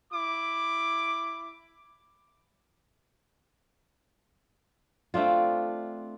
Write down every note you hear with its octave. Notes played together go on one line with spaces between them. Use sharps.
E4 D6
A3 C4 D4 F4